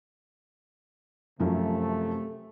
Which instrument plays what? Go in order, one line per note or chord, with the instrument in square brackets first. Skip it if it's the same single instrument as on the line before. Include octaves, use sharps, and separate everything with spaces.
[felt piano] F#2 F3 F#3 [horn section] C3 A3